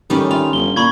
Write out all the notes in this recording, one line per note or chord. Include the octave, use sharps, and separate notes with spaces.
D#3 G3 C#4
F4 F7
G1 G7
A#2 B5 C#6 G#6